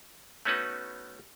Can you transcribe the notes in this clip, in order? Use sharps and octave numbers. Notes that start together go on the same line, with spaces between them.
A3 B3 C#4 D#4 F#4 B4